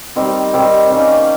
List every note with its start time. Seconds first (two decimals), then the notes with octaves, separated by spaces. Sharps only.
0.16 D#3 G3 C4 G4
0.53 D#3 G3 C4 G4
0.90 D#3 A#3 C#4